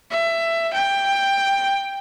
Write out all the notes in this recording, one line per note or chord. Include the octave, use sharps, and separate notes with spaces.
E5
G5